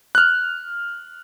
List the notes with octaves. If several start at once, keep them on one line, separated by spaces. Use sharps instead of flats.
F6 F#6